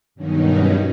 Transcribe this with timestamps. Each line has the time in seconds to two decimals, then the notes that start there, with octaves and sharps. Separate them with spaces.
0.15 G2 B2 D#3 F#3 C#4 D#4